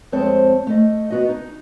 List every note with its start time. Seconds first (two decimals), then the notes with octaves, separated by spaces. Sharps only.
0.12 F2 G#3 C4 C5 C#5 A5
0.67 A3 D#5
1.10 B3 F#4 D#5
1.29 D#4